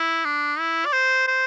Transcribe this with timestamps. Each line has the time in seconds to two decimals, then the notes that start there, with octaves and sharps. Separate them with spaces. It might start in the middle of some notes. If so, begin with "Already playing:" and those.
Already playing: E4
0.25 D4
0.59 E4
0.85 D5
0.93 C5
1.27 C5